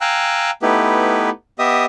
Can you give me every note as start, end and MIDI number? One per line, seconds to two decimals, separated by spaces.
0.01 0.51 77
0.01 0.51 79
0.01 0.51 80
0.01 0.51 82
0.01 0.51 88
0.01 0.51 90
0.62 1.30 57
0.62 1.30 59
0.62 1.30 63
0.62 1.30 64
0.62 1.30 67
0.62 1.30 71
1.59 1.86 59
1.59 1.86 67
1.59 1.86 75
1.59 1.86 76
1.59 1.86 87